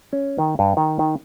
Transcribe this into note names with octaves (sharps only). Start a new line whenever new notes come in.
C#4
D#3
G2
D#3
D#3